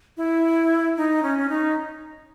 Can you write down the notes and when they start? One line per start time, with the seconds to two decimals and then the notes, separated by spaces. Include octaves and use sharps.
0.17 E4
0.97 D#4
1.23 C#4
1.38 C#4
1.49 D#4